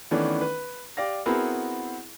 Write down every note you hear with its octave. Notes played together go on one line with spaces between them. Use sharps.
D#3 E3 A3 B3 C#4 D4
B4
G4 D5 F5 A#6
B3 C4 E4 F#4 G#4 A#4